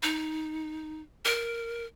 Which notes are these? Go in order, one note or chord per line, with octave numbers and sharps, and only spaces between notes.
D#4
A#4